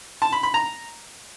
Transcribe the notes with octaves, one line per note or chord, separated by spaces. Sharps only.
A5
B5
B5
A#5